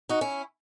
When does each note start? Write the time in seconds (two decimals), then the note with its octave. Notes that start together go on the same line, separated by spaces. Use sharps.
0.09 D#4 F#4
0.21 C#4 E4